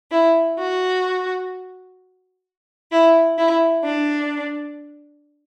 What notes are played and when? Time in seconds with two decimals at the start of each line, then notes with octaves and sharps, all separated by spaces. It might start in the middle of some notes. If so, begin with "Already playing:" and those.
0.11 E4
0.58 F#4
2.92 E4
3.37 E4
3.84 D4